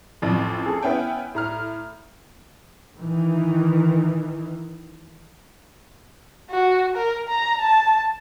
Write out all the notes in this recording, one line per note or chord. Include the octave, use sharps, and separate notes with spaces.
A1 F2
G#4 A4
B3 C#4 E4 G5
A2 A#5 F6
D#3 E3
F#4
A#4
A#5
A5